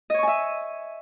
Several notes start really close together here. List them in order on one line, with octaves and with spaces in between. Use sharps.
D#5 C#5 C#6 G#5 E5